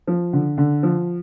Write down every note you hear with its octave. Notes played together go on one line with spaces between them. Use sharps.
F3
D3
D3
F3